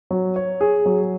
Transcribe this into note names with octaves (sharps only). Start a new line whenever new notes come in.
F#3
C#5
G#4
F#3